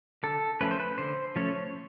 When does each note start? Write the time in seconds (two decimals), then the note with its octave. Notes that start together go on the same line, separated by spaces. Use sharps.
0.23 D3 A4
0.61 F3 A3 C#4 B4
0.71 C5
0.80 B4
0.98 D3 C5
1.36 F3 A3 C#4 C#5